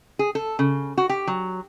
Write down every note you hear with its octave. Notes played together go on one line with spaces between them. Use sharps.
G#4
A4
C#3
F#4
G4
F#3